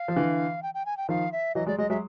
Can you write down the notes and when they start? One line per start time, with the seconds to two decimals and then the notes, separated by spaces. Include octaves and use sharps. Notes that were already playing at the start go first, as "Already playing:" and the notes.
Already playing: F5
0.08 F3
0.16 D3 E3
0.62 G5
0.74 G5
0.86 G#5
0.97 G5
1.09 D#3 F3 F5
1.32 E5
1.55 E3 F#3 D#5
1.67 F#3 G#3 D5
1.78 F#3 G#3 D#5
1.90 F#3 G#3 E5